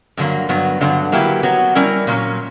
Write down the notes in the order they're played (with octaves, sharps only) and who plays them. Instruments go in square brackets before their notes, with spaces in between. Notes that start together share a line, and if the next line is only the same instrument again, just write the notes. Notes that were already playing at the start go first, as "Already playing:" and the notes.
[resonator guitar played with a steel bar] G2 D3 F#3 A#3
G2 F#3 B3
G2 D3 F#3 B3
F#3 A#3 E4 G4 B4
F#3 B3 F#4
G3 C#4 E4 A#4
A#2 F#3 C#4